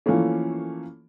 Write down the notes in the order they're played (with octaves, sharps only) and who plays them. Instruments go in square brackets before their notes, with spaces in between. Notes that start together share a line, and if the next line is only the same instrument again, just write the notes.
[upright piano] E3 F3 A3 A#3 C#4